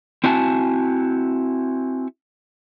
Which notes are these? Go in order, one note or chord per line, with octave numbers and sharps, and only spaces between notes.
C4 E4 F#4 G#5 A5